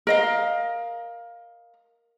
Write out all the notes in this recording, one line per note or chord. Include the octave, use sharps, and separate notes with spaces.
A#4 D#5 F5